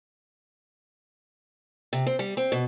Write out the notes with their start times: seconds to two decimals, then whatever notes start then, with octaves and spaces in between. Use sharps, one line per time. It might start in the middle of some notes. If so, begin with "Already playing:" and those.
1.93 C3
2.06 C4
2.19 G3
2.37 C4
2.52 B2